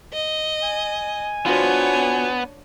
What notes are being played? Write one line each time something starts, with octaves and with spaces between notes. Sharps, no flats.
D#5
G#5
B3 D4 F4 F#4 C5 C#5